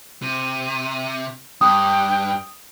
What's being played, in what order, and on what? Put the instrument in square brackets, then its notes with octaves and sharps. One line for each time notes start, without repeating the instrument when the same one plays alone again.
[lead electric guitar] C3 [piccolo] D#7
[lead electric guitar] G2 [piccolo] G5 [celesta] D#6